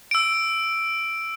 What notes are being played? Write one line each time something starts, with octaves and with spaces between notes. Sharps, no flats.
E6 D7